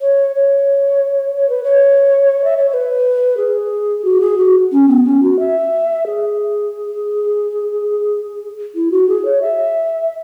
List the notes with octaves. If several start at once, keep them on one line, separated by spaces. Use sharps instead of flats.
C#5
C#5
C#5
B4
C#5
E5
C#5
C#5
B4
G#4
F#4
G#4
F#4
C#4
B3
C#4
F#4
E5
G#4
E4
F#4
G#4
C#5
E5